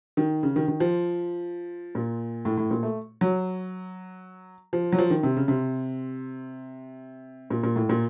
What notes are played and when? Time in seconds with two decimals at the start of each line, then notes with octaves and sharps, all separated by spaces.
0.17 D#3
0.43 C#3
0.56 D#3
0.68 D#3
0.80 F3
1.95 A#2
2.45 A2
2.57 A2
2.71 A#2
2.83 A3
3.21 F#3
4.73 F3
4.92 F#3
4.98 F3
5.10 D#3
5.23 C3
5.37 C#3
5.48 C3
7.50 A#2
7.63 A#2
7.76 A2
7.89 A#2